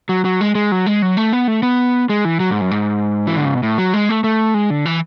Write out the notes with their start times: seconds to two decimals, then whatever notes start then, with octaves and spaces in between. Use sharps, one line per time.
0.09 F#3
0.25 F#3
0.41 G#3
0.55 G#3
0.72 F#3
0.86 G#3
1.02 F#3
1.17 A3
1.32 B3
1.48 A3
1.63 B3
2.09 G#3
2.25 E3
2.40 F#3
2.51 G#2
2.61 F#2
2.71 G#2
3.27 E3
3.37 D3
3.45 C#3
3.55 B2
3.63 A2
3.78 F#3
3.94 G#3
4.09 A3
4.24 A3
4.54 G#3
4.70 D3
4.86 E3